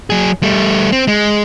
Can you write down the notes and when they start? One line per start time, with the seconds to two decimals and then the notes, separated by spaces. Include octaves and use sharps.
0.10 F#3 G#4
0.43 G3 A3
0.92 C4
1.08 G#3